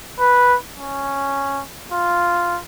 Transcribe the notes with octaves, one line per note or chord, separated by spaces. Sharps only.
B4
C#4
F4